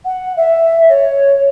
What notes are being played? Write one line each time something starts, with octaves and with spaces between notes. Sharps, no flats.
F#5
E5
C#5